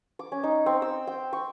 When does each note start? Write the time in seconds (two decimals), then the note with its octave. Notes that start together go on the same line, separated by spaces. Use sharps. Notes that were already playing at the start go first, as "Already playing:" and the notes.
0.19 D6
0.32 C#4
0.43 D#4
0.66 C4
0.82 E6
1.07 G5
1.33 C#6